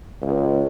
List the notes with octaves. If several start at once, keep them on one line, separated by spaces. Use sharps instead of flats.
C#2